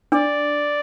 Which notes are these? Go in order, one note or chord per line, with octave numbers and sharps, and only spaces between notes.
D4 D5